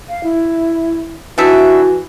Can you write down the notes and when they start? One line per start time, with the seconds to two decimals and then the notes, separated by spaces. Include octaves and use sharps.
0.09 F5
0.23 E4
1.38 E3 D4 D#4 F#4 E5